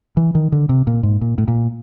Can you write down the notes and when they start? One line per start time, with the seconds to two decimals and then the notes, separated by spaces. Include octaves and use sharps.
0.17 E3
0.35 D#3
0.52 D3
0.69 C3
0.87 A#2
1.03 G#2
1.21 A#2
1.38 A2
1.48 A#2